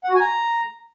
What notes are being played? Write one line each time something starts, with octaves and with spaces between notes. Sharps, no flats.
F#5
F#4
G#5
A#5